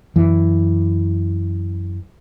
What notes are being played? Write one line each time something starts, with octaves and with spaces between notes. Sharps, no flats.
F#2 E3